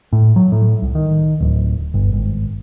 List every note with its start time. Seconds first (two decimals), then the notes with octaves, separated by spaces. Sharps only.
0.13 A2
0.36 F#3
0.52 A2
0.82 C2
0.95 D#3
1.40 D1
1.94 G1
2.13 G#1